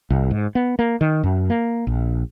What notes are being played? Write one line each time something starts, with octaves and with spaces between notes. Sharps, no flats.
C2
G#2
B3
A#3
D#3
F#2
A#3
A#1